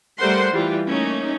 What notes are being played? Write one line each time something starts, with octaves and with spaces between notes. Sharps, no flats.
G3 A3 A#4 C5 F#5 C6
E3 G3 F4
A3 A#3 C#4 D#4